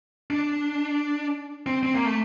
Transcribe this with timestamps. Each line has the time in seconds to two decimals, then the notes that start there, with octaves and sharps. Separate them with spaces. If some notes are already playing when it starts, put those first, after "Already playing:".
0.30 D4
1.66 C4
1.83 C4
1.94 A#3
2.05 A3